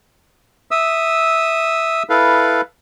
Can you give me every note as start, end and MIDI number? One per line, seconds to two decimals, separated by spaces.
0.71 2.03 76
0.71 2.03 87
0.71 2.03 88
2.10 2.61 64
2.10 2.61 69
2.10 2.61 71
2.10 2.61 77